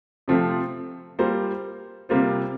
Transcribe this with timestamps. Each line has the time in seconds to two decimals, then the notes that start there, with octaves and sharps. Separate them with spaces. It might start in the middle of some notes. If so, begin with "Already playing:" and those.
0.28 C3 F3 A3 C4 F4
1.19 G3 A#3 F4 C5
2.09 C3 G3 A#3 F4 C5